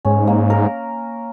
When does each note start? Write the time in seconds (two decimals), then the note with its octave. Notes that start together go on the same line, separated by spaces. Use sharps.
0.05 G#2 C#4
0.27 A#3
0.50 A#4